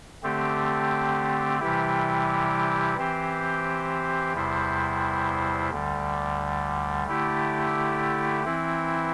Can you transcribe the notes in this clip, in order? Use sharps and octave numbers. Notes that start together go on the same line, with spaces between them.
D3 A3 C4 G4
C3 E3 G3 E4 G4
E3 C4 G4 C5
E2 C3 G3 E4 C5
D2 D3 G3
D3 A3 E4 G4
E3 C4 E4